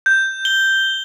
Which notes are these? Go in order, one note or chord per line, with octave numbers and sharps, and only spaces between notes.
G6
G7